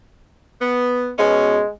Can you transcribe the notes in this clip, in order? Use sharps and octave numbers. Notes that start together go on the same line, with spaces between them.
B3
B2 G#3 C#4